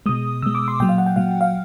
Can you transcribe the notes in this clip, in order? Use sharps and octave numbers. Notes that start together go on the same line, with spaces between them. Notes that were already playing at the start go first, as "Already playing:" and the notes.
B2 G#3 D#6
B2 G#3 E6
D6
C6
A#2 F#3 G5
F5
F#5
G5
A#2 F#3 F5
F5